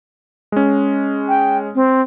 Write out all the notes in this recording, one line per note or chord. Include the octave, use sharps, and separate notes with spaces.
G#3 C#4
G5
C4